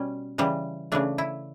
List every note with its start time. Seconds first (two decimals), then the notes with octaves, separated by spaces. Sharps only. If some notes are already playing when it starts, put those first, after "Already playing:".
Already playing: B2 G3 C#4
0.38 C#3 E3 G3
0.92 C#3 E3 A3 D4
1.18 E4